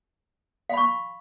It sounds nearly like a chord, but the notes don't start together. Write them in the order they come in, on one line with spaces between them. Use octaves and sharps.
F5 B5 C#6